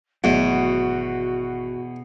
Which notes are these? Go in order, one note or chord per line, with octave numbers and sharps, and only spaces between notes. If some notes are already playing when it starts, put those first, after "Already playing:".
G#1 E2 B2 F#3 A3 F#4